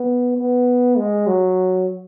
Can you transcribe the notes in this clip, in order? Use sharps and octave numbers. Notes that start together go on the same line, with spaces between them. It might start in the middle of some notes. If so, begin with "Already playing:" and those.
Already playing: B3
B3
G#3
F#3